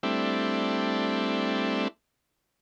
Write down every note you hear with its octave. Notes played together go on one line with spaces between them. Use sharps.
G3 A3 C4 D4 E4